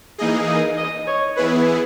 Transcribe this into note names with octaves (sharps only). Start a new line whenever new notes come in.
E3 A#3 D#4 G#4 D#5
D#5
D#5
C#5
E3 B3 E4 G#4 B4